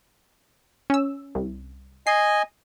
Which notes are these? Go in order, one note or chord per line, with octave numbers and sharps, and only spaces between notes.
C#4 E6
C2
D#5 G#5 C7